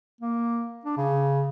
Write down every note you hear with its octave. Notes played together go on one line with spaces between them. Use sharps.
A#3
D4
C#3